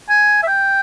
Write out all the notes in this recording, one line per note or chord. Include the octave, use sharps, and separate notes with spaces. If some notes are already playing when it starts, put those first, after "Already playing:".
G#5
E5
G5